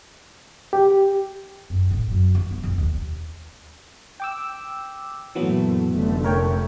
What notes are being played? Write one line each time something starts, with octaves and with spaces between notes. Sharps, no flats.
G4
F#2
A2
F#2
E3
B3
F2
D#2
G5 D6 E6
F#2 A#2 E3 F#3 A3 B3
F1 D3 A3
A#4 C#5 G5